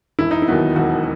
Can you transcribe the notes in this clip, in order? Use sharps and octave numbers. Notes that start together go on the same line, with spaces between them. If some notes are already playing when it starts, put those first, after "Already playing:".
E1 E4
D#4
E4
D#2 D#3 F#3 B3
E1 F#4